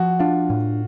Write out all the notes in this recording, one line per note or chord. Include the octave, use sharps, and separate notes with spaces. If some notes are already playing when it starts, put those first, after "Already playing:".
Already playing: F3 F#4
D4 F4
A2